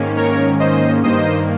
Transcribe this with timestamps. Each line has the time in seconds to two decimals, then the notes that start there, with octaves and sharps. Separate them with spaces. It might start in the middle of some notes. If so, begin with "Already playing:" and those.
Already playing: G#2 D#3 A#3 C#4
0.17 A#4 C#5
0.60 C5 D#5
1.03 G2 D#3 A#3 C5 D#5